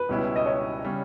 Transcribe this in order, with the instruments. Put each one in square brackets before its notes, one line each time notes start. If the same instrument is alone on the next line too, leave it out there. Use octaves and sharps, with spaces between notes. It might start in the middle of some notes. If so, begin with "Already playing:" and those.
Already playing: [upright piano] B4
[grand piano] C#2 B2 G3 C#4 E4
[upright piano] D#5
C#5
[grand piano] C#3 G3 C#4